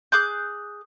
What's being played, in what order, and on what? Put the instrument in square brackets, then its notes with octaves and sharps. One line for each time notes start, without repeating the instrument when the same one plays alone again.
[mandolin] G#4 D6 F#6 G6